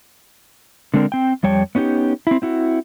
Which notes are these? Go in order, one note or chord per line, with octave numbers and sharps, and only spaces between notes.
D3 G#3 C4 D4 A#4
C4 G5
F2 G3 C#5 G5 A5
B3 C#4 D#4 F#4 G4
C4 E4
C4 E4 F#4